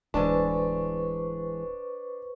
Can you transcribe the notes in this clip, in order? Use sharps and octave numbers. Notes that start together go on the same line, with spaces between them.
D1 E3 G#3 D4 B4 C5 A5 C#6